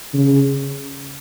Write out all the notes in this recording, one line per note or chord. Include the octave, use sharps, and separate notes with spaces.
C#3